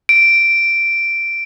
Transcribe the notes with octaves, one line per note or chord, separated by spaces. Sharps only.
D7